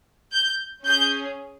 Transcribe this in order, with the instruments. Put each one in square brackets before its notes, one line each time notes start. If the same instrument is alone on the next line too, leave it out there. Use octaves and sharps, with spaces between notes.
[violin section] G6
C#4 G#4 G6